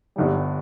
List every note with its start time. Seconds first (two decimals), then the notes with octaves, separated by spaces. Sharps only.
0.16 G1 G2 D3 G3